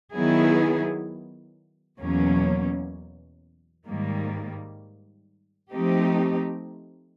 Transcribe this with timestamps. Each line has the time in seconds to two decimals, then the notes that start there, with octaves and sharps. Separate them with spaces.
0.15 D#3 F#3 B3 E4 G#4
2.00 E2 B2 F#3 A#3 C#4
3.86 G#2 D#3 G3 A#3
5.71 F3 A3 C4 D#4 G4